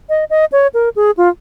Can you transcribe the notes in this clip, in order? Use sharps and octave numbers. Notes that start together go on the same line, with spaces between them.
D#5
D#5
C#5
A#4
G#4
F4